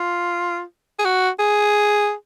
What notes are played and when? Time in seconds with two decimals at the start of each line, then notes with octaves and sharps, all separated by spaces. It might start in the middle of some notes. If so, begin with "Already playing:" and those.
Already playing: F4
0.99 G#4
1.05 F#4
1.39 G#4